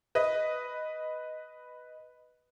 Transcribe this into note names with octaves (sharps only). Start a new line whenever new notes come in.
B4 D#5